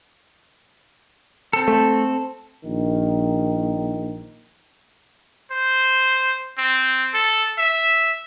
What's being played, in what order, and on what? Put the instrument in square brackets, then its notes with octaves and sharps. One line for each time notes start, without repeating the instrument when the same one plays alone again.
[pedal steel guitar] C4 A4
[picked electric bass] A3
[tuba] A#1 [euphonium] D#3
[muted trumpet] C5
C4
A4
E5